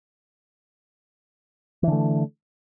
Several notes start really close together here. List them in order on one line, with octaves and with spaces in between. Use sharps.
E3 D3 A3